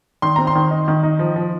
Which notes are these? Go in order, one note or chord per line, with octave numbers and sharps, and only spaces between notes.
D#3 C6
C4 A#5
C6
D#3
D#4
D#3
D#4
F3
F3